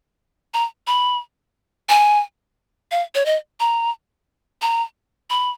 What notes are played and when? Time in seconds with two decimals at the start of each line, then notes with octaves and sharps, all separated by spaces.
0.54 A#5
0.87 B5
1.89 G#5
2.91 F5
3.15 C#5
3.26 D#5
3.60 A#5
4.62 A#5
5.30 B5